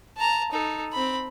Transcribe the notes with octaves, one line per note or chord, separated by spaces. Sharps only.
A5 A#5
D#4 A4
C4 B5